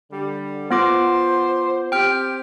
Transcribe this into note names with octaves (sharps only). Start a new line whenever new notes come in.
D3 G3
B3 F4 C5 D6
C4 G4 G5 F6